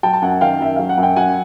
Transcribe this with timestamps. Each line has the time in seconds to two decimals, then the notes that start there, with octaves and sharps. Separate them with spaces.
0.03 F#3 G5 A5
0.13 A5
0.22 F#2 F#5 G#5
0.41 D#3 F5 G5
0.60 F#2 E5
0.76 F#3 F5
0.89 F#5
0.98 F#2
1.03 G5
1.16 F#3 F#5 G#5